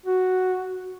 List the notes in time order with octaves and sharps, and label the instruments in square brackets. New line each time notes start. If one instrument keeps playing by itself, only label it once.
[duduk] F#4